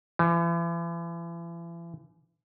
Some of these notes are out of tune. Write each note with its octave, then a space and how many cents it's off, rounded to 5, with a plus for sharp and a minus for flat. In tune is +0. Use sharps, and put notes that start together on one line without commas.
E3 +40